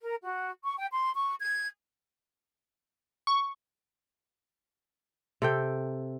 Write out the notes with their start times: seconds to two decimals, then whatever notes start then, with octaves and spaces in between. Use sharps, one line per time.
0.02 A#4
0.22 F#4
0.63 C#6
0.78 G5
0.93 C6
1.16 C#6
1.40 G#6
3.27 C#6
5.42 C3 A4 G5